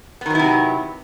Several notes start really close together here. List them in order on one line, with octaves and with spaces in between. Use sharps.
B3 D#3 F#3 E4 C3